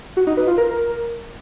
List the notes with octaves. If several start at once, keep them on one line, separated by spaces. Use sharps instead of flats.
F#4
D#4
B4
F4
A#4